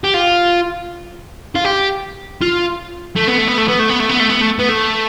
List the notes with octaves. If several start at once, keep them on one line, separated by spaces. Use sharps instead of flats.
G4
F4
F4
G4
F4
A3
B3
A3
B3
A3
B3
A3
B3
A3
B3
A3
B3
A3
B3
A3